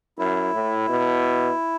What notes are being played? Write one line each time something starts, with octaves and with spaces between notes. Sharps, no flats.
F#2 E4
A2
B2